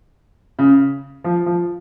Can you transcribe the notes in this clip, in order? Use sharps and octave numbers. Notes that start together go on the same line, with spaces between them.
C#3
F3
F3